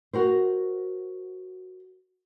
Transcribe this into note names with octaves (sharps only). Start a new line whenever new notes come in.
F#4 A#4 C5